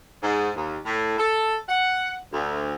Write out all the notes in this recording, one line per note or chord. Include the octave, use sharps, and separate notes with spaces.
G#2
D#2
A2
A4
F#5
D2